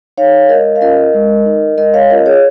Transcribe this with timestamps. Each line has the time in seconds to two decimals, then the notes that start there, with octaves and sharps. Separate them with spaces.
0.18 D#4 C#5 F5
0.49 G#3 A#4 D#5
0.76 F5
0.81 C#4 F4 A#4 D#5
1.14 G#3
1.46 D#4
1.78 G#3 A#4 D#5
1.94 C#5 F5
2.10 C#4 F4 A#4 D#5
2.26 G#4 C#5